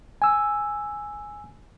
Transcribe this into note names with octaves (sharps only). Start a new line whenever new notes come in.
G#5 E6